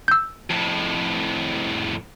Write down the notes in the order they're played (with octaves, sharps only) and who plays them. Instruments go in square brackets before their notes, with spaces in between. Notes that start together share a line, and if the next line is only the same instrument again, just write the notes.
[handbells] E6 G6
[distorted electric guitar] F2 A2